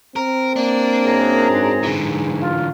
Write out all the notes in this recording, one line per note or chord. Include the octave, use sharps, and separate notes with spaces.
C4 A#4
A#3 D4
F#2 G#4 A#5
G#2
D3 E3
F4